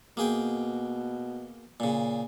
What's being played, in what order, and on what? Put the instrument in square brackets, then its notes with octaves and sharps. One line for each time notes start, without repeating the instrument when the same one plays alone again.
[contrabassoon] B2 [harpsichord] A#3 G#4 G5
[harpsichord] A#2 C#3